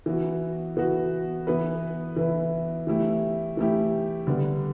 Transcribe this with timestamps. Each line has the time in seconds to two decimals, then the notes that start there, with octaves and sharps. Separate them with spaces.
0.06 E3 B3 F#4
0.77 E3 B3 F#4
1.47 E3 B3 E4 B4
2.16 E3 B3 E4 B4
2.87 E3 A3 E4 G4
3.57 E3 A3 E4 G4
4.27 D3 G3 B3